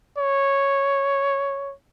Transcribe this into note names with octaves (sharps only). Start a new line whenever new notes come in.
C#5